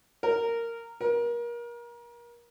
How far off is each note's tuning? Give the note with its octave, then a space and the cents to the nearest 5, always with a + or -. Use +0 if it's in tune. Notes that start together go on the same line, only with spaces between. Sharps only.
A#4 -10
A#4 +30